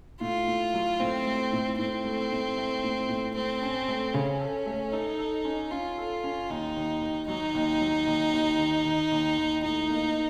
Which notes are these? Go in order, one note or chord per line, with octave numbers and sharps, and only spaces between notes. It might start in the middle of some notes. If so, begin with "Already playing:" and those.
A2 F4
A2
F#3
A2 C4
A3
A2
A2 C4
A3
A2
A3
A2
A2
A3 C4
C#4
A3
C#3 C#4
A4
A3
D#4 A4
A4
C#4
C#4 F4
A4
C#4
D#2 D#4
D#2
D#3
F#3 D#4
D#2
F#3
D#2
D#2
D#3
D#3
D#2
D#2
A2 D#4
A#3